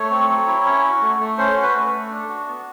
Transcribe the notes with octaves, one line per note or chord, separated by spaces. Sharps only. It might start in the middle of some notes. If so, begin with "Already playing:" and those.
Already playing: A3 C#5
C4
F#3
E4
C#4
F#4
A3
A3
C#4 C5
F#4
B4
A3
A3
D4
F#4
B3